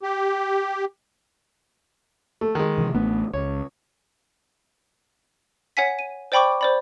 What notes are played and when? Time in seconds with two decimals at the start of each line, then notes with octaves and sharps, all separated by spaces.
0.03 G4
2.41 A3
2.55 D#3 G#3
2.78 C3 E3
2.95 A1 A3 B3 D4
3.34 C#2 C#5
5.77 C#5 F#5 G#5 B6
5.99 D#7
6.32 C5 D5 G5 B5 C#6 D6
6.61 C5 D5 B5